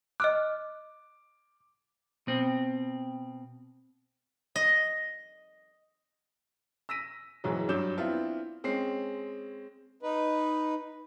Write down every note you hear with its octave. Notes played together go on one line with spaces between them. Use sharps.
D#5 D6 F6 F#6
B2 C4
D#5
E6 A#6 B6 D#7
F#1 G#2 E3 F#3
G2 F#3 D6 G6 E7
B3 C4 D4 E4 F4
G#3 C4 C#4 C7
D#4 B4